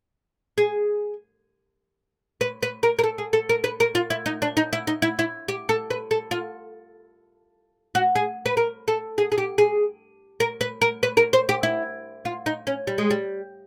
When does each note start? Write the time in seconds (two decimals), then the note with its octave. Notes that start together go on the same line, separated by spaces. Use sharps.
0.58 G#4
2.41 B4
2.63 B4
2.83 A#4
2.99 A#4
3.04 A4
3.18 G#4
3.33 A4
3.49 A#4
3.64 B4
3.80 A#4
3.95 F4
4.10 E4
4.26 D#4
4.42 D4
4.57 D#4
4.73 E4
4.87 D#4
5.02 E4
5.19 E4
5.48 G4
5.69 A4
5.90 B4
6.11 A4
6.31 F4
7.95 F#4
8.15 G#4
8.46 B4
8.57 A#4
8.88 A4
9.18 G#4
9.32 G#4
9.38 G4
9.58 G#4
10.40 A#4
10.61 B4
10.82 A#4
11.03 B4
11.17 A#4
11.33 C5
11.49 G4
11.63 E4
12.25 F4
12.46 D#4
12.67 C#4
12.87 G3
12.98 G#3
13.11 G3